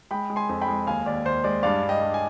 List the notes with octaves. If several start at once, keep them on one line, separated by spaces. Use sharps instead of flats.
G#3 G5 B5
G#3
G#5 C6
F2
G5 B5
G#3
D#2 F5 G#5
D#2 D5
D#2 C5
G#3 D5
G2 D5 F5
G2
D#5 G5
G2
G#5